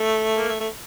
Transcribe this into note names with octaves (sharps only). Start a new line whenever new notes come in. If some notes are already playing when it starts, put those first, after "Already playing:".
Already playing: A3
A#3
A3
A3